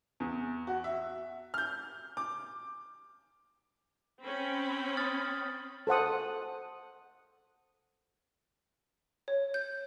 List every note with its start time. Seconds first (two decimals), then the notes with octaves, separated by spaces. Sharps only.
0.20 E2
0.67 F#4
0.84 E5
1.54 F6 G6
2.17 D6
4.21 C4 C#4 B5
4.97 D#6 F6 A6
5.87 A4 C5 F#5 D#6
9.28 C#5
9.54 G6